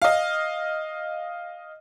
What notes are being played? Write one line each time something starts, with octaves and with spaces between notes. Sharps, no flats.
D#5 F5